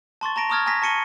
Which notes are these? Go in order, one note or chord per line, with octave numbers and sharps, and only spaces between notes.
A5 C6 C#6 A6
A5 A#5 A#6 D7
A#5 C#6 D#6 F6 G#6 A6
G#5 A#5 D#6 A#6 B6
A5 C#6 C#7 D#7 G7